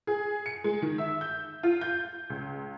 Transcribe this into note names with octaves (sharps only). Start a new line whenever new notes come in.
G#4
C#7
G#3
D#3
E5
G6
F4
G6
C#2